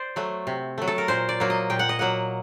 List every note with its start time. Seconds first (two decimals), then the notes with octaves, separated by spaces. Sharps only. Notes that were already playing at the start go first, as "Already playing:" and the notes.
Already playing: C5 D5
0.16 F#3 A3
0.47 C3
0.78 F#3 A3
0.88 A4
0.98 A#4
1.08 A#2 C5
1.29 D5
1.40 F#3 A#3
1.50 D#5
1.70 A#2 G5
1.79 F#5
1.89 D#5
1.99 F#3 A#3 F#5